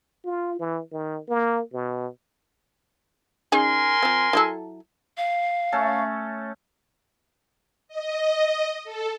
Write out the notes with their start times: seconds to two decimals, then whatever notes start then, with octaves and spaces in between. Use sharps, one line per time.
0.25 F4
0.60 E3
0.92 D#3
1.29 A#3
1.73 B2
3.52 C#3 D#4 G#4 A#4 G#5 C6
4.03 F3 C4
4.33 F#3 E4 A4
5.17 F5
5.72 A3 C#4 A4
7.88 D#5
8.84 A4